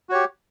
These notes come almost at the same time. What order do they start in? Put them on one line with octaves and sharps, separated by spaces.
F#4 C#5 G4